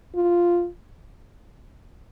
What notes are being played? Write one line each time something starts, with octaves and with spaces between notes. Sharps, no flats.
F4